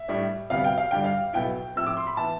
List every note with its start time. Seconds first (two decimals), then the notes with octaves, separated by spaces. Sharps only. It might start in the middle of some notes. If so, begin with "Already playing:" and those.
Already playing: E5
0.08 A2 G3 D4
0.50 D2 C3 G3 B3 F5
0.64 G5
0.78 F5
0.91 G2 D3 G3 D4 G5
1.04 F5
1.33 B1 B2 B3 E4 G5
1.75 A2 F3 C4 E6
1.87 D6
1.97 C6
2.07 B5
2.17 E3 B3 E4 A5